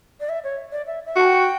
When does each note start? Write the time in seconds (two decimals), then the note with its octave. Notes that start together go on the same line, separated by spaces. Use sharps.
0.20 D5
0.29 E5
0.44 C#5
0.72 D5
0.87 E5
1.05 E5
1.16 F#4 A5
1.25 G5